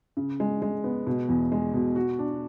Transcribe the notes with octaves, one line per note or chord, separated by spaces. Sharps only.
C#3
G#3
G#3
B3
B2
E2
G#3
B2
F#4
D4